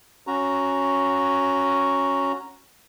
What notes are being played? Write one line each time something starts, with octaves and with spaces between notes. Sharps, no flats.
C#4 F#4 A#5